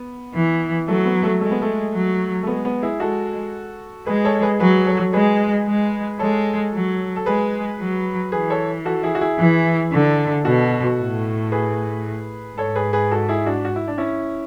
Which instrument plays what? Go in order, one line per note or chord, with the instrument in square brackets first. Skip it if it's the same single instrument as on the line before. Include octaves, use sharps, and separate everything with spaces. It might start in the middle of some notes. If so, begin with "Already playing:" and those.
Already playing: [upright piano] B3
[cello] E3
[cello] F#3 [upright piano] A3
[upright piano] B3
A3
[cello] G#3 [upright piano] A3
[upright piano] B3
A3
[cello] F#3
[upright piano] A3
[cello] G#3 [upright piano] B3
[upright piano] B3
E4 G#4
[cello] G#3 [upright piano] F#4 A4
[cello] G#3 [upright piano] G#4 B4
[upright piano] A4 C#5
G#4 B4
[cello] F#3 [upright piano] G#4 B4
[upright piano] A4 C#5
[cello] G#3 [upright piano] G#4 B4
[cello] G#3
[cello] G#3 [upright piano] A4 C#5
[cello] F#3
[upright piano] A4
[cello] G#3 [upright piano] G#4 B4
[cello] F#3
[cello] E3 [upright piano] G#4 B4
[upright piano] A4 C#5
F#4 A4
E4 G#4
F#4
E4 G#4
[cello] E3
D3
[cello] B2 [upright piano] F#4 A4
[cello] A2
[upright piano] G#4 B4
[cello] G#2 [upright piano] A4 C#5
[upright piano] G#4 B4
G#4 B4
F#4 A4
E4 G#4
D4 F#4
F#4
E4
D4
C#4 E4